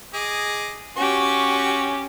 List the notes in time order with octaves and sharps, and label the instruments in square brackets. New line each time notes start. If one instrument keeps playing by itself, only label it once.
[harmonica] G#4 D#5 D6
[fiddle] C#4 G4 [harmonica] F#4 C#6